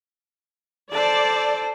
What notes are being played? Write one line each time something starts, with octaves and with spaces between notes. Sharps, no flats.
A4 C5 D5